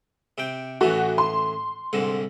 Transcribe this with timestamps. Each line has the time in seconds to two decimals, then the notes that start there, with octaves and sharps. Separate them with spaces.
0.38 C3 G5
0.81 A1 E3 A3 F#4
1.18 C6
1.93 C2 G#2 D3